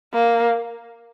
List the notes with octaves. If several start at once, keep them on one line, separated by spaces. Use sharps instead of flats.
A#3